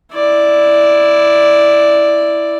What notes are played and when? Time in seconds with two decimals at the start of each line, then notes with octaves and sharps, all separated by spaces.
0.14 E4 D5